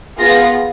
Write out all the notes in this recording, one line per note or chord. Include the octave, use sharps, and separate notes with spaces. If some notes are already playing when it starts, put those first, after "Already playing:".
B3 F4 G#4 A#6